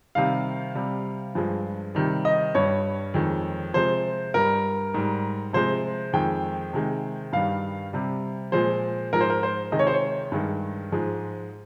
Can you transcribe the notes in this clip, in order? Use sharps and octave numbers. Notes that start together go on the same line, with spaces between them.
C3 D#3 G3 F5
C3 G3
G2 F3 G#3
C3 D#3 G3
D#5
G2 G3 C#5
F2 D#3 G#3
C3 F3 G#3 C5
G2 G3 A#4
G#2 G3
C3 F3 G#3 C5
F2 D#3 G#3 G5
C3 D#3 G#3
G2 D#3 G3 F5
C3 G3
A#2 F3 G#3 C5
G#2 F3 G#3 A#4
C5
A#4
C5
C3 D#3 G#3 D#5
C#5
C5
C#5
G2 D#3 G#3
G#2 F3 G#3